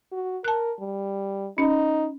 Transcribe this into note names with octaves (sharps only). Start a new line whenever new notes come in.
F#4
A#4 A5 F#6
G3
C#4 D#4